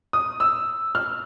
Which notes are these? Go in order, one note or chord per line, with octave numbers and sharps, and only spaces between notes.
D#6
E6
F6